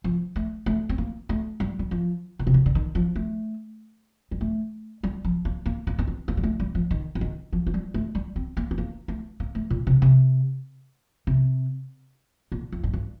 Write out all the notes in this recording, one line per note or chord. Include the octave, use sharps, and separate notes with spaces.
F3
A3
A3
C4
A#3
A3
G3
G3
F3
A#2
C3
D3
D3
D#3
F3
A3
G3
A3
G3
F3
A#3
A#3
A#3
A#3
C4
A#3
G3
A3
G3
F3
D#3
F3
D#3
F3
F3
G3
A3
G3
C4
A#3
C4
A#3
A3
A#3
A3
A#2
C3
C3
C3
A#2
F2
A2
G2